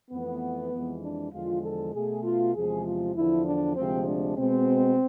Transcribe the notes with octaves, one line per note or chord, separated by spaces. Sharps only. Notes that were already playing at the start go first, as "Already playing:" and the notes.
F2 E3 A3 B3
F2 E3 G#3
D4
E2 D3 F3 G#3 F4
A4
B2 A3 G#4
F4
E2 C3 F3 G#3 G#4
F4
E2 D3 F3 E4
D4
D2 C3 F3 G#3 C4
D4
B2 G#3 C4